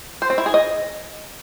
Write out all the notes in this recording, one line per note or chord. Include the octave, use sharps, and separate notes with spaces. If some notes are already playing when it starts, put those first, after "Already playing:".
C5
C4
E4
G#4
D#5